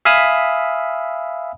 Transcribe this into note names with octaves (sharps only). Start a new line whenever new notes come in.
E5 F5 G#5 B5 D#6 E6